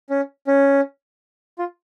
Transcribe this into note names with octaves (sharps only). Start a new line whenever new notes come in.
C#4
C#4
F4